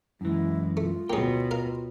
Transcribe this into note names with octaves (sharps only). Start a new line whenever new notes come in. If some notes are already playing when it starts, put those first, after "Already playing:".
F#2 E3 G#3 E4
A3 F4
D2 B2 A#3 G#4 C#5 G5
A#4 F5